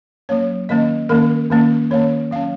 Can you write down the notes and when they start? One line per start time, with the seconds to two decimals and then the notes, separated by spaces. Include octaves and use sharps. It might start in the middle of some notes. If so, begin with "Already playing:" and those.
0.29 F#3 A#3 C#4 C#5
0.69 D#3 A#3 C#4 D#5
1.09 D#3 A#3 C#4 A#4
1.50 D#3 A#3 C#4
1.91 D#3 A#3 C#4 C#5
2.31 F#3 C#4 F5